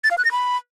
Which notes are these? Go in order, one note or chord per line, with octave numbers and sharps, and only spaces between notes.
A6
F5
F#6
A#6
B5